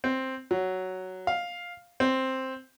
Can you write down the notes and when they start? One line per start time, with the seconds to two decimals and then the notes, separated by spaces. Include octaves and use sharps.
0.04 C4
0.51 F#3
1.27 F5
2.00 C4